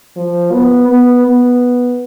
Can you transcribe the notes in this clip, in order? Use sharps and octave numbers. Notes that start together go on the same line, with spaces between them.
F3
B3
B3
B3